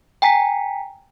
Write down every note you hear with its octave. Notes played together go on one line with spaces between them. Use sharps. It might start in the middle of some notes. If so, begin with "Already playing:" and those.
G5 G#5 A#5 B6